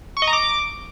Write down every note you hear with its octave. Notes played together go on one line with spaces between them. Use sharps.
C#6
D#5
A#5
D6